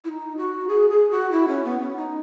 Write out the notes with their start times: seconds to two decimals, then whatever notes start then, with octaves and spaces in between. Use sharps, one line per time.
0.05 E4
0.09 D#4
0.37 F#4
0.69 G#4
0.90 G#4
1.11 F#4
1.32 E4
1.48 C#4
1.64 B3
1.80 C#4
1.96 D#4